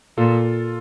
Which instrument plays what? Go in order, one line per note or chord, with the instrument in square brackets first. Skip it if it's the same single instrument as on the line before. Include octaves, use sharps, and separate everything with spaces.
[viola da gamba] A#2 [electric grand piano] F4 A4